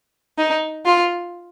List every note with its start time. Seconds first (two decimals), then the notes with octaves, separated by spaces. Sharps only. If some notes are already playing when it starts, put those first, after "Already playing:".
0.38 D#4
0.86 F4